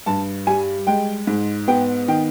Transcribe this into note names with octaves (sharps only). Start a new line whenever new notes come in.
G2 A5
G3 G#5
G#3 G5
G#2
B3 G5
D#3 G5